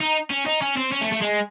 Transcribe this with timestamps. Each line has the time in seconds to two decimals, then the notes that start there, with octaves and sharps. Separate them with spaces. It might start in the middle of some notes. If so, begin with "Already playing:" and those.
0.01 D#4
0.30 C#4
0.46 D#4
0.62 C#4
0.77 C4
0.92 C#4
1.01 A3
1.12 A3
1.22 G#3